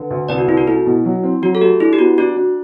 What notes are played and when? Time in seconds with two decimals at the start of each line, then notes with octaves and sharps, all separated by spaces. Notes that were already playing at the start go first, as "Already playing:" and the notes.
Already playing: D3 B4
0.10 D2
0.29 C2 B4 D5
0.38 F#4
0.48 C2 E4
0.57 F#4
0.67 A3 E4
0.86 B2
1.05 F#3
1.23 C4
1.42 F#3 F#4
1.55 A4
1.61 A3 G4
1.80 D4 E4
1.93 G4
1.99 B3 F#4
2.18 D4 F#4
2.37 D4